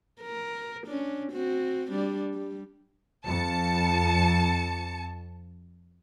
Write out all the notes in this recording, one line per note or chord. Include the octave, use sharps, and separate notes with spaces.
A#4
C#4 D4
C4 F#4
G3 D4
G3
F2 A5 C#7